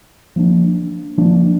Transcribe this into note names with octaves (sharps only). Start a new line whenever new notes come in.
F3 A#3 D4
F3 A#3 D4